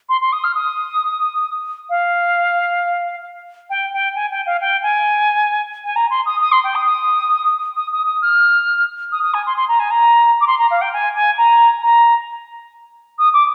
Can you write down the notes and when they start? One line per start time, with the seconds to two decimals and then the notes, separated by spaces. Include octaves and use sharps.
0.09 C6
0.21 C6
0.32 D#6
0.44 F6
0.55 D#6
1.90 F5
3.70 G5
3.93 G5
4.15 G#5
4.30 G5
4.46 F5
4.61 G5
4.83 G#5
5.84 G#5
5.96 A#5
6.10 C6
6.26 D#6
6.40 D#6
6.52 C6
6.64 G5
6.75 D#6
6.86 D#6
7.76 D#6
7.92 D#6
8.06 D#6
8.22 F6
9.12 D#6
9.23 D#6
9.34 G#5
9.46 C6
9.57 C6
9.68 A#5
9.79 G#5
9.90 A#5
10.41 D6
10.47 C6
10.59 A#5
10.70 F5
10.81 G5
10.93 G#5
11.15 G#5
11.38 A#5
11.82 A#5
13.18 D#6
13.33 D6